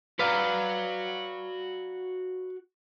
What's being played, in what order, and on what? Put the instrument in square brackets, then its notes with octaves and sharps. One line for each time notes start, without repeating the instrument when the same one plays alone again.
[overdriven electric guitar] F#4 A#5 [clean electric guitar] B4 D5 F5